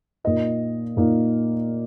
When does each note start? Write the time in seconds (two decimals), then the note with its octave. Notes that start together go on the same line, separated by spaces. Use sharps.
0.24 A#2 A#3 D#4 D#5
0.97 A#2 A#3 D#4